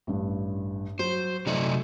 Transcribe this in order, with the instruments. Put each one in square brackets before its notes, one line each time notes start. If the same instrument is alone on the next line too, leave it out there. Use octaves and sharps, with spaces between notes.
[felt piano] A1 G2
[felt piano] F#3 [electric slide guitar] C5
[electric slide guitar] C3 D#4 D5 [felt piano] F#3 A3